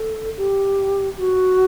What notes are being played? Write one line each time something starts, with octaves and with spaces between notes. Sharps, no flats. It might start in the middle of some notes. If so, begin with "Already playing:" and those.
Already playing: A4
G4
F#4